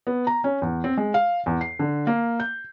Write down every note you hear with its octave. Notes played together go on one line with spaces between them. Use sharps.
B3
A#5
C#4
E2
C4
G#3
F5
E2
C7
D3
A#3
G6